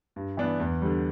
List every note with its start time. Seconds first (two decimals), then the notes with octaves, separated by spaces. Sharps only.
0.16 G2
0.37 E3 B3 D4
0.60 E2
0.82 D3 G3